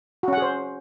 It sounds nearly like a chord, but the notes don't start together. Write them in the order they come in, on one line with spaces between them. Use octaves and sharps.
F#4 C#4 F#5 G#4 C5